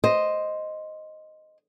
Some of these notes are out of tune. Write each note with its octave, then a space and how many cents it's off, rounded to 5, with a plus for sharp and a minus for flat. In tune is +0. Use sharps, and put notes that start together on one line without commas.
C5 +0 D#5 +0